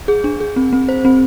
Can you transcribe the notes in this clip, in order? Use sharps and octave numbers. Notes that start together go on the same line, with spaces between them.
G#4
D4
G#4
C4
C4
C5
C4